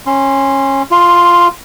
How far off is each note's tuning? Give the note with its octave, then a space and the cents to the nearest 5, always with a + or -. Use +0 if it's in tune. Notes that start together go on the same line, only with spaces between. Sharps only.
C#4 -20 C6 +0
F4 +0 C6 +20